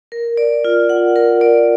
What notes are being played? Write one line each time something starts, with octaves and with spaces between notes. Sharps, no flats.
A#4
D5
F4
F#5
A#4
D5